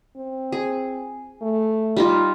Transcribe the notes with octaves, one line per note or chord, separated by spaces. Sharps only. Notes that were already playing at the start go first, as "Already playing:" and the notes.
C4
G#4
A3
G3 D#4 F4